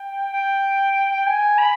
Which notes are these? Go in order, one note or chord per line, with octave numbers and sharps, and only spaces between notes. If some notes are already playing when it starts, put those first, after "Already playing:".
Already playing: G5
G5
G#5
B5